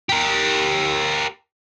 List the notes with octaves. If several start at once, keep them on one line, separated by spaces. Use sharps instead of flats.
G4 A#4